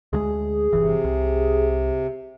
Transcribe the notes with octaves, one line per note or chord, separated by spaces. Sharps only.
D2 F#3 G#3 G#4
G1 C#2 C3 E3
C2